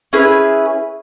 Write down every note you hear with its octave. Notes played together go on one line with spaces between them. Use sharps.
C#4 E4 G#4 B4